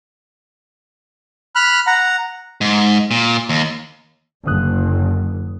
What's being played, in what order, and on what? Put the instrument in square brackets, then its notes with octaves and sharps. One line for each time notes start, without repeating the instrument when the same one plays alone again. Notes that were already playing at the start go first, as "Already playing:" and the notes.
[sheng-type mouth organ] B5 F6 F#6
F#5 A#5
[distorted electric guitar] G#2
A#2
D#2
[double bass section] F#1 [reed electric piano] D3 D#6 F#6